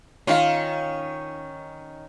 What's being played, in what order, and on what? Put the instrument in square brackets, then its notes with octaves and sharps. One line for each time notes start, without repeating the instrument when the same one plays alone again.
[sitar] D#3 C#4 [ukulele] F4 F5